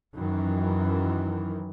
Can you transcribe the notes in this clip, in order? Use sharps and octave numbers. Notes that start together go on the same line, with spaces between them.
F#2 D#3 E3